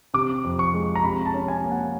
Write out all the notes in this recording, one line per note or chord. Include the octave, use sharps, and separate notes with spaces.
C3 D6
F2
C#6
G#3
A#5
C3 B5
A5
C#4
G#5
A#3
F#5